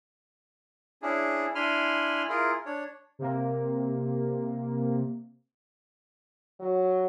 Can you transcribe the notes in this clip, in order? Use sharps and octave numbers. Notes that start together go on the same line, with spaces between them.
C#4 D4 E4 G#4
D4 E4 G#5 B5 C6 F6
E4 F4 G#4 A#4
D4 C#5
C3 A#3
F#3